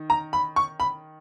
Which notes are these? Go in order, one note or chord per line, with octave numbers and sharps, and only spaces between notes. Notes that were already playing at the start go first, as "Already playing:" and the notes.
Already playing: D#3
A#5
B5
C#6
B5